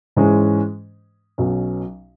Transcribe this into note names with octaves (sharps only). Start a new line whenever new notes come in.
G#2 E3 G#3 C#4
B1 B2 F#3 C#4